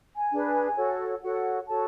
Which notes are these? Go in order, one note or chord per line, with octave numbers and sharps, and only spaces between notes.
G#5
D4 G#4 B4
F#4 A4 C#5
F#4 A4 C#5 F#5
F#4 A4 C#5 A5